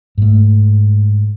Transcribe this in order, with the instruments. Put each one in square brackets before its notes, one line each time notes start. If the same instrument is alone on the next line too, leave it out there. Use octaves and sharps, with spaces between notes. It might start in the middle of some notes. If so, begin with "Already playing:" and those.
[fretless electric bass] G#2 A3